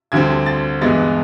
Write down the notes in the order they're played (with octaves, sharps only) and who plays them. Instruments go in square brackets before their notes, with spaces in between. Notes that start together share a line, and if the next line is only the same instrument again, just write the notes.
[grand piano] D2 D3 G3 C4 G#6
A6
G2 E3 G#3 B3 A6